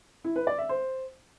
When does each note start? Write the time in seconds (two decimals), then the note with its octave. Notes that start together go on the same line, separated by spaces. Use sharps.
0.24 E4
0.36 B4
0.47 D5
0.58 E5
0.69 C5